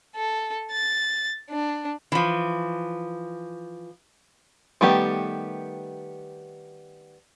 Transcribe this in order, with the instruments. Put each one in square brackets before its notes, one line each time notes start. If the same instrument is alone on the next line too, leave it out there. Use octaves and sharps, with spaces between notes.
[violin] A4
A6
D4
[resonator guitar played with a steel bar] E3 F3
[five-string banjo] D#3 G3 A3 B3 G4